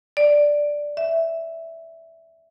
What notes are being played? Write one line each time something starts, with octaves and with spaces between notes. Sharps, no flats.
D5
E5